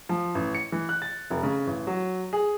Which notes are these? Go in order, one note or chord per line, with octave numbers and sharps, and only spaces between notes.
F3
A1
C#7
E3
F#6
A6
F1
C#3
A1
F#3
G#4